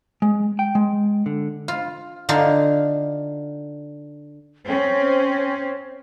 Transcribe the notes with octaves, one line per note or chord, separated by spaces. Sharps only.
G#3
G5
G#3
D3
F4
D3 D4 D#4 F4
C4 C#4 C5 C#5